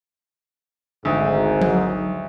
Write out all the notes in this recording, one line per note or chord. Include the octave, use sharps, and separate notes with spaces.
G#1 D2 G#2
F#3